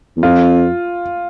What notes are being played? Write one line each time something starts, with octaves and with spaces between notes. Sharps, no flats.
E2
F2 F4